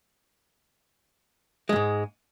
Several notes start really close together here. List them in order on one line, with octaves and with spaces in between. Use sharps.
G#3 F2 G#2